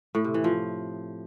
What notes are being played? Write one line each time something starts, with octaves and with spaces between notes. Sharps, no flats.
A2
C3
E3
F3